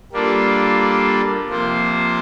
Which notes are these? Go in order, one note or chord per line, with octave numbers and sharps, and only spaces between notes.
G3 A#3 D4 F4 A4
C3 F3 A#3 F4 C5